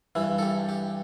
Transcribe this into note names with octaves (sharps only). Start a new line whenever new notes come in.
G2 E3 E4
A4
G4
G4